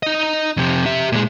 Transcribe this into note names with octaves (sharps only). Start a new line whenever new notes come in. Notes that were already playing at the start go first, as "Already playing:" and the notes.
D#4 D#5
F2 C3
G4 E5
A#2 G#3